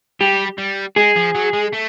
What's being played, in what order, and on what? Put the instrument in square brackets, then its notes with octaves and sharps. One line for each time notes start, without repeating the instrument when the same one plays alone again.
[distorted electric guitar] G3 [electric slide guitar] G4
[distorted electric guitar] G3
[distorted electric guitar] G#3 [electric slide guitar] G#4
[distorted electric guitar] F3
F#3
G#3
A3